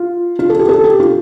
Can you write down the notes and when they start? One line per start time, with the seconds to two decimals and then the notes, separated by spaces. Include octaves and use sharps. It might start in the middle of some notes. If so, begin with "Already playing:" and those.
Already playing: F4
0.39 F4
0.49 A4
0.59 G4
0.69 A4
0.84 G4
1.00 F4